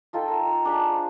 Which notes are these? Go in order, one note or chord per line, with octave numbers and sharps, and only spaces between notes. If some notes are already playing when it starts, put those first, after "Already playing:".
D#4 F4 A4 G5
A#4
D4 G#4 B5
C5